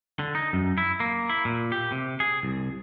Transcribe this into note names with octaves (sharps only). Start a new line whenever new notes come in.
D3
D#4
F#2
E4
A#3
E4
A#2
G4
C3
G#4
C2